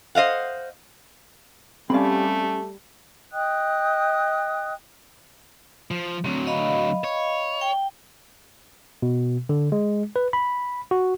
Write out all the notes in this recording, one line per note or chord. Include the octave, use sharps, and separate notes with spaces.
C5 D#5 F5 F#5
G3 A3 C4 C#4 D5 F5 B5
D#5 G5 D#6 F#6
F3
D2 F#3 C4
D#5 F5 B5
C#5
G5
B2
D3
G#3
B4
B5
F#4